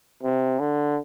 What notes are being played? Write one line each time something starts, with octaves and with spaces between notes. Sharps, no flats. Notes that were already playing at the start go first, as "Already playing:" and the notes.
C3
D3